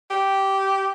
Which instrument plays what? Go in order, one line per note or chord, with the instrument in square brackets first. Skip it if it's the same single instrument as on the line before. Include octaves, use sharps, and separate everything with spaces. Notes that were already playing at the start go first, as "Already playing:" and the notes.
[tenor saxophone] G4